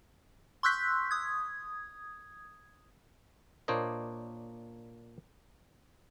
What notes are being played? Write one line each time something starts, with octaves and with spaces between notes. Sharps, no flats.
C6 C#6 E6 F#6 G6 B6
D#6 G#6
A#2 A#3 D4 C5 C#5 D#5